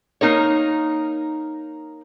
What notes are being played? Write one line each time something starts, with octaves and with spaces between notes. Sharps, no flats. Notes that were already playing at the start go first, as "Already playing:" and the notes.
A#3 D#4 A#4 C#5